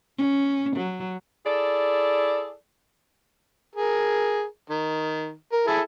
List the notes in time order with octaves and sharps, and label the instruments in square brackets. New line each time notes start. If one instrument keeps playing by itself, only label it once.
[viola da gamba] C#4
F#3
[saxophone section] E4 G#4 A4 D5
[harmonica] G#4 A#4
D#3
A#4
E4 G#4 A4